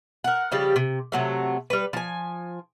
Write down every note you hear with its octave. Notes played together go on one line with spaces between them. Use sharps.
A#4 F#5
C#3 F3 G3 G4
C3
C3 F#3 A3
G3 B4
F3 G#5